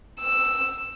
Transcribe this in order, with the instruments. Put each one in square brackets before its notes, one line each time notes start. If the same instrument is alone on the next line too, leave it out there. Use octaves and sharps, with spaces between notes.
[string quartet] E6